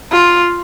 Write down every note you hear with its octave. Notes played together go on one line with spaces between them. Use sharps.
F4